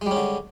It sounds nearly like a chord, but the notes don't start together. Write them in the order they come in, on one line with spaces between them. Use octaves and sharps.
G#3 G3 C#4 D3